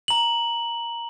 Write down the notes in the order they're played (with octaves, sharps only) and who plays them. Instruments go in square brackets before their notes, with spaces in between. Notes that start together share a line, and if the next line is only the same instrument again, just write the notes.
[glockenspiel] A#5 F#7